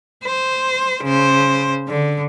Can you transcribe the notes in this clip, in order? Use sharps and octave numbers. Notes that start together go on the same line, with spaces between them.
C5
C#3 C5
D3